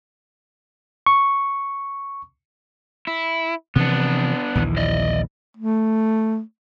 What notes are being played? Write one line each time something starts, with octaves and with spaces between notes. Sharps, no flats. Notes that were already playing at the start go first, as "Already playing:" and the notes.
C#6
E4
C3 E3 F3 B3 D4
A#1 D#2 E3
D5 D#5
A3